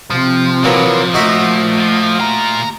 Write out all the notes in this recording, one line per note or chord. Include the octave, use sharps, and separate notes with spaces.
C3 F3 C4
A#2 E3 F#3 A#3
A3 D#4 F#4 E5
A#2 F4
G4 A#5